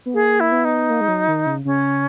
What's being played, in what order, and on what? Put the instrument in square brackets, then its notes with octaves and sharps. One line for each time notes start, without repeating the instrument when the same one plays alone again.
[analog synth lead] B3
[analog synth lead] A#3 [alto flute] G#4
[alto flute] E4
[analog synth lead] B3
[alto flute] D#4
[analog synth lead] A#3
G#3
F#3
D#3
C#3
[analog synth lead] C#3 [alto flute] C#4